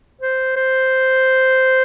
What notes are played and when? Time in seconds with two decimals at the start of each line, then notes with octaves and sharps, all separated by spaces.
0.21 C5
0.56 C5